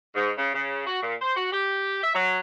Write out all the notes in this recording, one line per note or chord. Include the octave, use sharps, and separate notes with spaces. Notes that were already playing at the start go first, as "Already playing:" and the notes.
G#2
C#3
C#3
F#4
A#2
C5
F#4
G4
E5
F#3